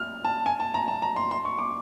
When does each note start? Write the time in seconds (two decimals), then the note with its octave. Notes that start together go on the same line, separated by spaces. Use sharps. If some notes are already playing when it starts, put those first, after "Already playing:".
Already playing: F6
0.25 A5
0.46 G#5
0.60 A5
0.74 A#5
0.88 A5
1.02 A#5
1.16 C6
1.31 C6
1.45 C#6
1.58 D6